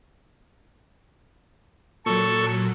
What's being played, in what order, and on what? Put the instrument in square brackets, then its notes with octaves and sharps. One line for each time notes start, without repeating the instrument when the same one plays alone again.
[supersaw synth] A#2 F#3 [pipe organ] A4 C#6